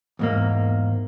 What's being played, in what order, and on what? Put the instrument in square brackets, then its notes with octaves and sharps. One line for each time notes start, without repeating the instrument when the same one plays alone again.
[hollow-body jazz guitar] E2 G#2 A#3